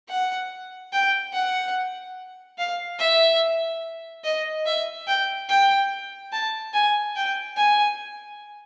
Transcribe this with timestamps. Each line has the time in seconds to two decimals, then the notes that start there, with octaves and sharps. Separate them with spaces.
0.09 F#5
0.93 G5
1.33 F#5
2.58 F5
3.00 E5
4.24 D#5
4.66 E5
5.08 G5
5.49 G5
6.32 A5
6.74 G#5
7.16 G5
7.57 G#5